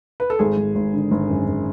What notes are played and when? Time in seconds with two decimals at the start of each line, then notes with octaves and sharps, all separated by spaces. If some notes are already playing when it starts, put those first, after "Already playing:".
0.20 B4
0.30 A4
0.39 G#1 G#4
0.57 G#1
0.75 G#1
0.94 D3
1.11 G#1
1.30 F#2
1.47 F#2